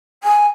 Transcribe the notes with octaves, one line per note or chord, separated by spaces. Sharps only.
G#5